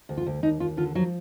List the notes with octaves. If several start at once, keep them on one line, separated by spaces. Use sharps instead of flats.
D2
F4
D2
D#2 D#4
D#2 F4
D3 F4
F3 F#3